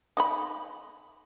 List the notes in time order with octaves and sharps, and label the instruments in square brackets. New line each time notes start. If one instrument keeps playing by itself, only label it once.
[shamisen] D#4 D#5 B5